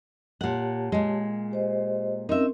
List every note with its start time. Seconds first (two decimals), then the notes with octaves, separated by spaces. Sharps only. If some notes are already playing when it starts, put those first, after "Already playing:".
0.41 A#2 G4 C#5 F#5 A5
0.92 A#2 G#3
1.51 G4 C5 D#5
2.29 C4 C#4 D#4 A#4 E5